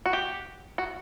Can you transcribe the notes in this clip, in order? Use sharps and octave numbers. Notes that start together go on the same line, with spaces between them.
F#4
G4
F#4